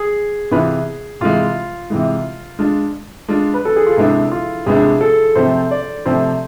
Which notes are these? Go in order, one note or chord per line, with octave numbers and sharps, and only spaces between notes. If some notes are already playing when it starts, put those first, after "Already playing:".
Already playing: G#4
C3 E3 B3 F4 B4
C3 E3 G#3 F4
C3 E3 G#3
G#3 D4 F4
G#3 D4 F4
B4
A4
G#4
F4
C3 G#3 B3 D4 E4
F4
C3 G#3 B3 D4 G#4
A4
C3 F3 A3 C4 C5
D5
C3 F3 A3 C4 C5